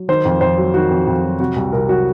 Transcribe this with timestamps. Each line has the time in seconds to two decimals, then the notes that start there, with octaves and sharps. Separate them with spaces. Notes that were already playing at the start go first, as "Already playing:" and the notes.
Already playing: F#3
0.08 D#3 C5
0.25 F2
0.41 F2 C5
0.57 F#3
0.74 D#3 F#4
0.91 F2
1.07 F2
1.24 F#3
1.40 C3 F#4
1.56 C2
1.72 C2 A#4
1.88 F#3 F#4